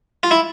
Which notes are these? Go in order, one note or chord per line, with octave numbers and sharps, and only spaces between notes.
F4
E4